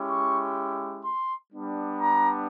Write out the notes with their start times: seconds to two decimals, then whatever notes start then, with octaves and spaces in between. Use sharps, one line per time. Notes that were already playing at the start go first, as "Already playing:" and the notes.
Already playing: G#3 C#4 E4 G4
0.08 C#6
1.04 C6
1.52 G3 B3 D4
2.01 A#5